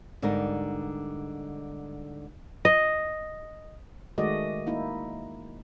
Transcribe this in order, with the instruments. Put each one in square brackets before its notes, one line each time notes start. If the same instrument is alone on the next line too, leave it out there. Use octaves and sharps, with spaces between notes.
[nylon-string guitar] G#2 D3 G3 A#4 D5
[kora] D#5
[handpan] D#3 G#3 A3 F#4 D5 D#5
A#3 D#4 E4